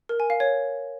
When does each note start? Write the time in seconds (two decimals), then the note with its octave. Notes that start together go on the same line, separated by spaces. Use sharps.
0.09 A#4
0.20 G#5
0.30 F5
0.40 C#5